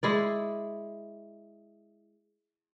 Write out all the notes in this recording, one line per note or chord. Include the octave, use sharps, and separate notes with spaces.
G#3 E4 D5